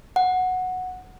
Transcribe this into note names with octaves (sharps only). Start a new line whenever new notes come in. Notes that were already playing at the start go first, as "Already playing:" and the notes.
F#5